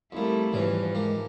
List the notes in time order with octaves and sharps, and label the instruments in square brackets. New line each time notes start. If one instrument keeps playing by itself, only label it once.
[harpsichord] F2 A#3 [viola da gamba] G3 A3 E4
[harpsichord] E2 G3 C#4 [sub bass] G#2 [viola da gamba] E3 F3 [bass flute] B4
[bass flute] G#3 [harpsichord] A#3 G4